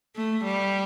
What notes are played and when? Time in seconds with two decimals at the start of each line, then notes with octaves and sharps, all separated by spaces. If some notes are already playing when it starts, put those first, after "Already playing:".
0.16 A3
0.45 G3